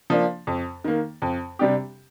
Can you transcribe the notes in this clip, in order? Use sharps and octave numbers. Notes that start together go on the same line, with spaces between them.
F3 A#3 D4
F2
D#3 A#3
F2
C3 G3 D4 G4